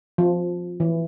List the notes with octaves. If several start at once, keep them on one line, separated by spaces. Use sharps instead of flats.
F3
E3